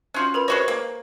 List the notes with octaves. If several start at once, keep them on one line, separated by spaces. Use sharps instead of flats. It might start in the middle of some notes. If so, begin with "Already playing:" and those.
C#4 F4 F#4 F#6 G6
A#4 B4 B5
G#3 F#4 C5 C#5 C#6 A#6
A#3